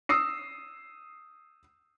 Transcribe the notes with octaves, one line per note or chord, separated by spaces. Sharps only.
D#6 E6 C7